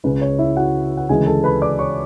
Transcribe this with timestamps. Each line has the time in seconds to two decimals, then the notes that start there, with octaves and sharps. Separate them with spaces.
0.04 C#2 C#3 G#3 B4
0.21 C#5
0.38 E4 E5
0.56 F#4 F#5
0.97 F#5
1.09 D2 C#3 E3 G#3 G#4 G#5
1.26 A4 A5
1.44 B4 B5
1.62 D5 D6
1.79 C#5 C#6